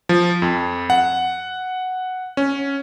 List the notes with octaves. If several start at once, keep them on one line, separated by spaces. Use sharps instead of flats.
F3
F2
F#5
C#4